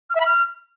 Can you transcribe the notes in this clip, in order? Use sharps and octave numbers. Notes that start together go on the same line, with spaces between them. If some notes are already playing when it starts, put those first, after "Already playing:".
F6
E5
B5
F6